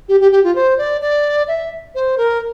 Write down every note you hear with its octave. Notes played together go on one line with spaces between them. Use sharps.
G4
G4
G4
F4
C5
D5
D5
E5
C5
A#4